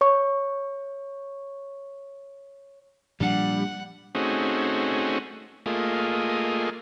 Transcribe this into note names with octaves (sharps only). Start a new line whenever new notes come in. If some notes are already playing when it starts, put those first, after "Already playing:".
C#5 C#6
A#2 F3 G3 D4 F#5
A3 C4 C#4 D#4 F#4 G#4
A3 A#3 F4 G#4 D#5